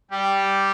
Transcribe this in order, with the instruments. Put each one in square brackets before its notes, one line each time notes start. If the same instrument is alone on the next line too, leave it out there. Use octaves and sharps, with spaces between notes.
[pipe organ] G3 G4